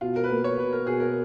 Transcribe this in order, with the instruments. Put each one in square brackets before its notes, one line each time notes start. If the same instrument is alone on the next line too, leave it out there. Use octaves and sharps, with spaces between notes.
[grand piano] B2 [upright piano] F4
[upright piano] A#4
B4
[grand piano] A#3 [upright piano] A#4
[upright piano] C#5
[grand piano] B2 [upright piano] B4
[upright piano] A#4
[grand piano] B2 [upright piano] G#4
[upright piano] A#4